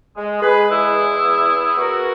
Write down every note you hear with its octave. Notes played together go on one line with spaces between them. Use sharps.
G#3
G#3 G#4 B4
E2 E4 G#4
E2
B3
B3
B3 F#4 A#4